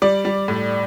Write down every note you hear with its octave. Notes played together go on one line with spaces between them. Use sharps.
G3 D5
G3
A2